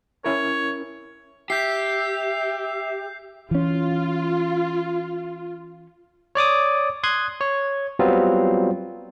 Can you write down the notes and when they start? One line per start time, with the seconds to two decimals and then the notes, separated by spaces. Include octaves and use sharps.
0.24 C#4 E4 A#4 C#5
1.50 G4 E5 G6 C7
3.51 E3 C#4 F4
6.35 C#5 D5 D6 D#6
7.03 C6 D#6 F#6 G#6
7.41 C#5
7.99 F#3 G3 B3 C4 F4